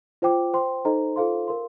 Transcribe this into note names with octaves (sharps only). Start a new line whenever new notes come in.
F4 C5 G5 D6
C5 G5 C6
D#4 A4 C5 D#5 A#5
F4 A4 C5 F5 C6
A#4 F5 C6